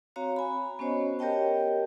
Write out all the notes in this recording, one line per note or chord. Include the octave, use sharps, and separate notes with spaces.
C4 F#4 C#5 F5 A#5
G#5 B5
B3 C#4 F#4 C5 C#5 D#5
G4 A#4 C#5 D#5 G5 A5